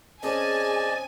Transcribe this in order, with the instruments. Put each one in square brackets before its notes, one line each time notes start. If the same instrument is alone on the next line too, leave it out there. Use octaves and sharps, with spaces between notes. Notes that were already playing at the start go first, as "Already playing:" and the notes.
[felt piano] C4 C#4 [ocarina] G#4 [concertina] D5 D#5 A5 [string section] G#5